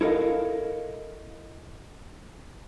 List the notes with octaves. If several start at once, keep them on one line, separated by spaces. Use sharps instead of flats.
E4 A4 A#4 D#5 F5